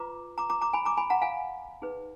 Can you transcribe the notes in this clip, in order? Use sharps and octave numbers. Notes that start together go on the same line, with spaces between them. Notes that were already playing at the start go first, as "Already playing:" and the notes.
Already playing: F4 B4 A#5 D6
A#5 D6
A#5 D6
A#5 D6
G#5 B5
A#5 D6
G#5 B5
F#5 A#5
F5 G#5
D#4 G#4 B4